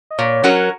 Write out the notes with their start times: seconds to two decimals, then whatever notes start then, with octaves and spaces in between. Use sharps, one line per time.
0.11 D#5
0.18 A#2 C#5
0.44 F#3 C#4 F#4 A#4